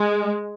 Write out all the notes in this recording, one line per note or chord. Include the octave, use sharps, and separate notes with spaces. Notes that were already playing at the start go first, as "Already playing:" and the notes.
Already playing: G#3